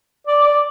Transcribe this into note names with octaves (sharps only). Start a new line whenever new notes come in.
D5
D5